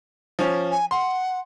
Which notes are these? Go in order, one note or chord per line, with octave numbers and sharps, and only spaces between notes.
F3 C#4
G#5
F#5 C6